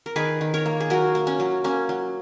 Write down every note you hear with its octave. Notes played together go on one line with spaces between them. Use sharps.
A#4
D#3 G#4 B4
D#3
A#4 C#5
A#3
G#4
F#3 F#4 A#4
A#3
C#4
F#3
A#3 C#4
F#3